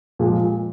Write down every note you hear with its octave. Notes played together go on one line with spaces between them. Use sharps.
A#2 F3 G#3